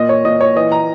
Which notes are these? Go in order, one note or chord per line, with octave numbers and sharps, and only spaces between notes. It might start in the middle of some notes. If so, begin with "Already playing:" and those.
Already playing: A#2 D#5
C#5
A#2 D#5
C#5
E3 D#5
A#5